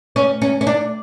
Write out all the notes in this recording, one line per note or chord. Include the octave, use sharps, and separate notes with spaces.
C#4
C#4
C#4
D4